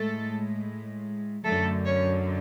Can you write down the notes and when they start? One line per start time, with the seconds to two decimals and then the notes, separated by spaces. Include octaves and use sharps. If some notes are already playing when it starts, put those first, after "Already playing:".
Already playing: A2 G#3 A3 A4
1.44 F#2 D3 F#3 A3 A4
1.86 C#4 C#5